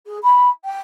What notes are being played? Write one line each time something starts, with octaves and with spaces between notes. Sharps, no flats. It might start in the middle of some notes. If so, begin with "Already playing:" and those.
G#4
B5
G5